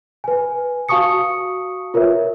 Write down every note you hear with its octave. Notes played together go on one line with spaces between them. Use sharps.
B4 G#5
F#4 F5 A5 C#6 D#6 C#7
F4 A#4 B4 C#5 E5